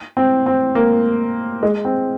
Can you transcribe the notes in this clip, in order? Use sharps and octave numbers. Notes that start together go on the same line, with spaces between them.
C4
C4
A#3
G#3
C4